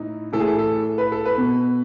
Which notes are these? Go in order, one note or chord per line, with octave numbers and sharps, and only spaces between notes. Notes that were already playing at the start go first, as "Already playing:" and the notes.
Already playing: A2 E3 D#4
A2 E3 A4
G#4
A4
A4
B4
A4
B4
B2